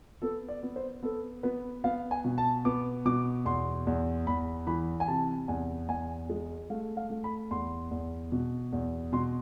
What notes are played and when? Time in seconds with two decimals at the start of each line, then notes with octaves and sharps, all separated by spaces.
0.22 B3 A4
0.48 D5
0.63 B3
0.76 C5
1.03 B3 A4
1.43 B3 B4
1.84 B3 F5
2.11 G#5
2.24 B2
2.38 A5
2.65 B3 D6
3.05 B2 D6
3.45 E2 C6
3.87 E2
4.27 E2 B5
4.67 E3 B5
5.00 G#5
5.08 C3 A5
5.48 E2 G#5
5.89 E2 G#5
6.29 G#3
6.70 A3 F5
6.97 F5
7.10 A3
7.24 B5
7.51 E2 C6
7.91 E2
8.32 B2
8.73 E2
9.12 B2 C6